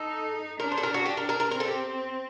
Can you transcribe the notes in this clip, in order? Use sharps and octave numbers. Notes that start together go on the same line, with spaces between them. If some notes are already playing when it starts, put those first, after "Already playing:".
Already playing: D#4 A4
D4 A#4
C5
A4
A#4
F#4
D4 G4
A#4
A#4
A#4
C4 A#4
A4
G4